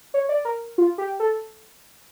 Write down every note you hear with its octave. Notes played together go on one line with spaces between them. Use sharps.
C#5
D5
A#4
F4
G4
A4